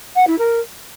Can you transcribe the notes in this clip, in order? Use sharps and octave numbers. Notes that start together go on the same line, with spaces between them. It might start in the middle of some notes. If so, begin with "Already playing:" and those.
F#5
E4
A#4